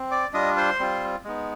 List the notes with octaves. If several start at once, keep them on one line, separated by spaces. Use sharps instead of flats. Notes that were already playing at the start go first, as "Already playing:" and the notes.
Already playing: C4
D5 D6
G3 D4 F4 D#5 D#6
C5 C6
G3 C4 F4
G#3 B3 D#4